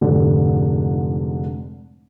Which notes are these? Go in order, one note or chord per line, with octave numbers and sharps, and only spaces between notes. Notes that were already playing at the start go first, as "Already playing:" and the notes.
F1 G#2 D3